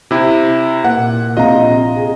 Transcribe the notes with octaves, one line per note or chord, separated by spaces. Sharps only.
C3 E4
A#2 F#5
A#1 C3 F4 D#5 A#5
G#4